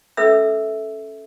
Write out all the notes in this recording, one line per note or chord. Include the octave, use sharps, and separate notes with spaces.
C#4 A4 B4 E5 E6